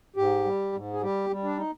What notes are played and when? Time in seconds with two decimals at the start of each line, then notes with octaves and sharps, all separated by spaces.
0.16 G#2 G4
0.45 G3
0.73 G#2
0.93 G#4
1.01 G3 G4
1.30 G3
1.44 D4
1.58 D#4